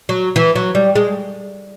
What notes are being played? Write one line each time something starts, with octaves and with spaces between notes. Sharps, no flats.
F#3
E3
F#3
G3
G#3